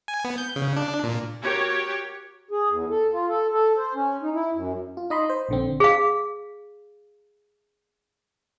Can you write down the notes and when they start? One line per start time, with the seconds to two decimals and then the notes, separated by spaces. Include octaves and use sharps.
0.08 G#5
0.24 B3
0.38 G6
0.56 C#3
0.76 D4
1.03 A#2
1.41 F#4 G4 A#4 C#5
2.51 G#4
2.69 E2
2.90 A4
3.13 F4
3.29 A4
3.52 A4
3.77 C5
3.95 C#4
4.22 D#4
4.34 E4
4.54 F#2
4.97 F4
5.10 D#4 D#5 B5 C6
5.30 C5
5.49 A#1 D3 C4
5.80 G#4 F5